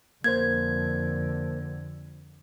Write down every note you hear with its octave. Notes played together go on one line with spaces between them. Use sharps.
F2 D3 A#3 A#4 C5 G#6